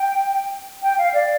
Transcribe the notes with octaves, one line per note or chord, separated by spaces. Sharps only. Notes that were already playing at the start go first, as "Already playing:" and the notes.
Already playing: G5
G5
F5
D5